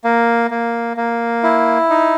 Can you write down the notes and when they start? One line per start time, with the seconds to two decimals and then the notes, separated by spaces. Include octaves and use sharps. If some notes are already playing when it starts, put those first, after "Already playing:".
0.04 A#3
0.51 A#3
0.97 A#3
1.43 E4
1.90 D#4